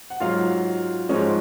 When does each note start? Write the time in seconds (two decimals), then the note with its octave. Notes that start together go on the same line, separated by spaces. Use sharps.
0.10 F#5
0.20 G#2 F#3 F4 F5
1.09 G#2 F3 G#3 C#4 C#5